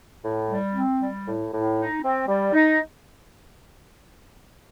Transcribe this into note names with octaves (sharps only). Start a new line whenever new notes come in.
A2
G3
C4
G3
A2
A2
D#4
C4
G3
D#4